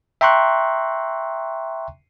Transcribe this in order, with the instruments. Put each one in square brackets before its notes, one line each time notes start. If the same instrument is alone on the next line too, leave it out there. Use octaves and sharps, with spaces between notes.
[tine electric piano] E5 G5 A#5 C6 C#6 F#6